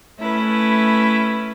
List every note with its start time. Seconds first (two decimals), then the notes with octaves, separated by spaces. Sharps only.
0.18 A3 C#4 E4 B4